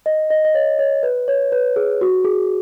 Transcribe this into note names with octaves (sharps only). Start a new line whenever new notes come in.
D#5
D#5
D#5
C#5
C#5
B4
C#5
B4
G#4
F#4
G#4